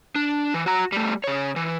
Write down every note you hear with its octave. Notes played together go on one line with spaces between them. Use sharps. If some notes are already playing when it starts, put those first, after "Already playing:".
D4
E3
F#4 A#5
G3 A3
C#3 C#5
E3